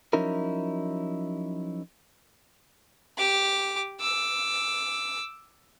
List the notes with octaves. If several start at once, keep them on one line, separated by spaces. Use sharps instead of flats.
F3 F#3 C#4 D#4 E4 A#4
G4 D6
D6 E6